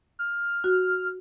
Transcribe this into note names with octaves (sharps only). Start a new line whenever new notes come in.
F6
F#4